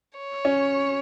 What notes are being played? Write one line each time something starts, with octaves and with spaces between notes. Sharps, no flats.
C#5
C#4